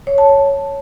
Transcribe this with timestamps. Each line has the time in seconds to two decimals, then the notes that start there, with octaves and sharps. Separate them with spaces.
0.07 C#5
0.18 A5
0.29 C#5